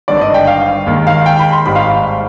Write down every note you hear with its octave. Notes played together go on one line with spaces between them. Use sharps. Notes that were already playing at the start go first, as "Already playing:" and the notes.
G#1 G2 D3 D5
D#5
G5
F5
D#2 D#3 G#3
F5
G5
B5
C6
G#1 G#2 G3 B5
F5